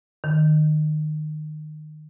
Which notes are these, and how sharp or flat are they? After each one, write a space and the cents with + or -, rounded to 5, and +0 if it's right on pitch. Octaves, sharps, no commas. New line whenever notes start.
D#3 -25